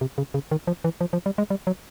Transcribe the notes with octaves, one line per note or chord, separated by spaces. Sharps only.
C3
C#3
C#3
D#3
F3
E3
F3
F3
G3
G#3
G3
F#3